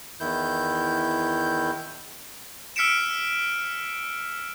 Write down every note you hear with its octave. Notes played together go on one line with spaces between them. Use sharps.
E2 D#3 E4 G6
E6 F6 B6 C#7 D7 E7